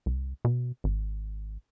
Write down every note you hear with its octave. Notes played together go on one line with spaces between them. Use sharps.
C2
B2
G#1